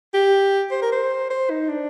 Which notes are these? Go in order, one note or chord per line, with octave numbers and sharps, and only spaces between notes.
G4
C5
A#4
C5
C5
D#4
D4